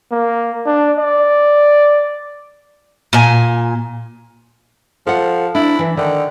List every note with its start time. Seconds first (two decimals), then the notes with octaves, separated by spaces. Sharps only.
0.12 A#3
0.66 D4
0.98 D5
3.13 A#2 G#5
5.07 F3 A4 F#5
5.55 D4 E4
5.79 E3
5.97 D3 D#3